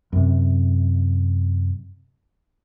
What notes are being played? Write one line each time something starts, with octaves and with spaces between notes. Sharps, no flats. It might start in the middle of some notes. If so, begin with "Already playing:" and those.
F#2 C3